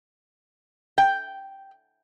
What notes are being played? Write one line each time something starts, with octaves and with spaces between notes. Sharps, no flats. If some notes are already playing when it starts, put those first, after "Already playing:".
G5